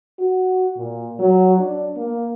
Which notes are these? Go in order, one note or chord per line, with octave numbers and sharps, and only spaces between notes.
F#4
A#2
F#3
D4
A#3